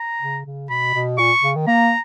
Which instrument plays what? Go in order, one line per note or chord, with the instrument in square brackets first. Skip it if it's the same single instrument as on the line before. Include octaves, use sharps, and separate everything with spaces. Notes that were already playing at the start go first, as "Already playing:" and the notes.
Already playing: [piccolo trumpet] A#5
[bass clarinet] C#3
C#3
[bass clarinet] B2 [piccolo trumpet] B5
[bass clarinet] B2
[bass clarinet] A#2 [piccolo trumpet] C#6
[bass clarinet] C#3
D#3
[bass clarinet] A#3 [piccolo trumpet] A#5